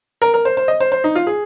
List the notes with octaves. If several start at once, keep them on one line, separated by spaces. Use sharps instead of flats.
A#4
A#4
C5
C5
D#5
C5
C5
D#4
F4
G#4